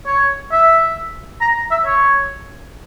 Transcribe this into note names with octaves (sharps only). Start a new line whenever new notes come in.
C#5
E5
A#5
E5
C#5